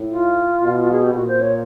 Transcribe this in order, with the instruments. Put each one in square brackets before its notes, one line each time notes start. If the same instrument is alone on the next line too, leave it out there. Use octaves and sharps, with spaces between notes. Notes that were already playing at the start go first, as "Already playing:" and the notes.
Already playing: [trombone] A2
[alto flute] F4
[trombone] B2
[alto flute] G#4
G4
[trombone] A#2 [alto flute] F#4
[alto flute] C5
C#5